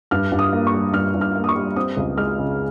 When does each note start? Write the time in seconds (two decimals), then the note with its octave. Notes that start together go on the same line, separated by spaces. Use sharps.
0.11 G2 F6
0.32 G2
0.39 D#6
0.53 A#3
0.67 C#6
0.74 G3
0.93 G2 F6
1.14 G2
1.21 F6
1.35 A#3
1.44 D#6
1.49 C#6
1.55 G3
1.76 C4 D#6
1.97 C#2
2.18 G#3 F6
2.38 C#3